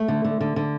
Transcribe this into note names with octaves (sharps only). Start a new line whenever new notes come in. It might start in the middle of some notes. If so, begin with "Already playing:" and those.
Already playing: A3
D3
D3
D3
D3